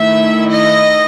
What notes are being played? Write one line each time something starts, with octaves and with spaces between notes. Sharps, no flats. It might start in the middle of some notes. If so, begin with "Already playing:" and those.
Already playing: D#3 A3 E4 E5
D#5